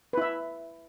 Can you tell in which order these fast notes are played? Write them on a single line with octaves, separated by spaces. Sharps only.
B4 E4 E5